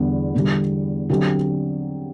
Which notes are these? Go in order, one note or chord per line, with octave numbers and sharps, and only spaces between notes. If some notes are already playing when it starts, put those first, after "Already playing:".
Already playing: E2 D3 G3 B3
E2 D3 G3
D3 F#3 C4 G4